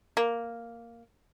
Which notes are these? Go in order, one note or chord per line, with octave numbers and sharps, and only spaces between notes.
A#3